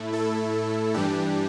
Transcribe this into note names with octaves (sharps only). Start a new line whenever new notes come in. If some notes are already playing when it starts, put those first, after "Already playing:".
Already playing: A2 A3 E4
E4 A4
G2 E3 G3 D4 G4